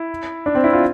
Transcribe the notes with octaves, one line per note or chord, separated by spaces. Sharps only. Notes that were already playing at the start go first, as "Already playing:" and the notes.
Already playing: E4
D4
C4
E4
F4